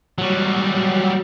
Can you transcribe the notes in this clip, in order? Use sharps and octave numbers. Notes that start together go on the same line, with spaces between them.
F#3 G3